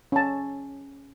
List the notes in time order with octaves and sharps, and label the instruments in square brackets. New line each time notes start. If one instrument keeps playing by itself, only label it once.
[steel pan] C#4 A5